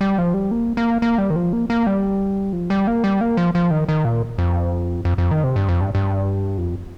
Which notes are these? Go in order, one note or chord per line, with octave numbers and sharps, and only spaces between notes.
G3
F3
G3
A#3
A#3
A#3
G3
D#3
F3
A#3
A#3
G3
F3
G3
A#3
G3
A#3
F3
F3
D#3
D#3
A#2
F2
F2
F2
D#3
C3
G2
F2
G2
G2
F2